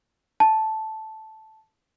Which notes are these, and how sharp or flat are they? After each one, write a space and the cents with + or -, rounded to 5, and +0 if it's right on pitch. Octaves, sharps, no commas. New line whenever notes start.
A5 -5